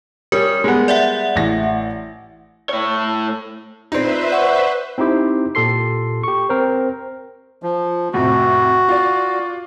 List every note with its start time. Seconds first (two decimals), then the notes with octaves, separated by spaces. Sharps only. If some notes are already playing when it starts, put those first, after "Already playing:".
0.32 G3 C#4 A#4
0.64 G3 G#3 B3
0.88 D5 E5 F#5
1.36 A1 A#6
2.69 A2 C#5
3.92 C4 D#4 F4 B4 C5 D5 E5 C7
4.31 D5 F#5 C#6
4.98 C4 D#4 E4 G4 C5
5.55 A#2 G4 A4 C6 C7
6.23 G4 C#6
6.49 C4 A#4 C5
7.63 F3
8.13 F2 A2 C3 F#4
8.89 F4 D5